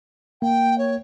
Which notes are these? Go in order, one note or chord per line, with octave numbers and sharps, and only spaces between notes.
A#3 G5
C#5